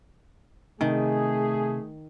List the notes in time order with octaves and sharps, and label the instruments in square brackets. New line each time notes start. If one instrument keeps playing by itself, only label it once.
[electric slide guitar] C3 [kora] D#3 [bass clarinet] A3 [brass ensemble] G#4